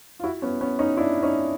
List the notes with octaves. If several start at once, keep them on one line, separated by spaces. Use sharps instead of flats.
F4
E4 F#4
B3 C#4
B3 C#4
C#4 D#4
D4 E4
C#4 D#4